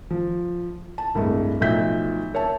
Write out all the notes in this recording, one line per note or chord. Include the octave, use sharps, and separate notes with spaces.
F3
A5
C2 G2 G#3 A3
B1 F3 A3 E5 G6 B6
A#4 C#5 E5 A5